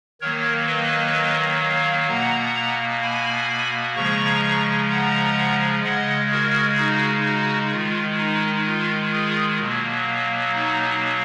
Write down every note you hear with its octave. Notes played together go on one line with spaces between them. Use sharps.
D#3 F#3 A#3 A#4 C#5
B4 D#5
C#5 F5
B2 A#3 F#5 A#5
G#5 B5
C#3 F3 G#3 A#5 C#6
F#5 A#5
C#3 G#3 D#5 F#5
F#4 A#4
D#4 F#4
D#4 F#4
D#3 G#3 F4
D#4
F4
F4 G#4
B2 F#3 A#3
D#4